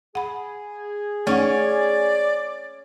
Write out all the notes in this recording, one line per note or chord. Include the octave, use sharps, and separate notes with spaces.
G#4 F#5 B5
A3 C#4 D#4 D5 F#5